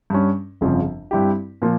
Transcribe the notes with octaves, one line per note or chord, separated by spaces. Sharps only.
G2 G3 C#4
G1 F2 C#3 F3
G2 G3 C4 E4 G4
A#2 F3 A#3